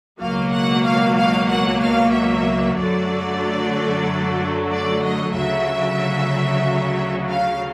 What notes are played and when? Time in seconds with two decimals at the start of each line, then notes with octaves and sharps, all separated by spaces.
0.20 C#2 B2 F#3 A#3 F5
0.52 F#5
0.84 F5
1.17 F5
1.49 F#5
1.81 F5
2.13 E5
2.78 F#2 D3 F#3 A3 D5
4.71 D5
5.03 D#5
5.35 D2 C#3 F#3 E5
7.29 F5